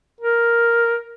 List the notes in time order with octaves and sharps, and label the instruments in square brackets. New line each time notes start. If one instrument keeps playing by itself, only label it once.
[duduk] A#4